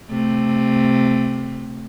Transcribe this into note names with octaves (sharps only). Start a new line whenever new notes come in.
C3 A3